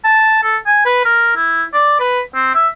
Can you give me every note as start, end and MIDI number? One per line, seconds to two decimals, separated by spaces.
0.04 0.40 81
0.43 0.57 69
0.66 0.81 80
0.86 1.01 71
1.05 1.34 70
1.36 1.63 64
1.73 1.98 74
2.00 2.21 71
2.35 2.54 60
2.54 2.68 76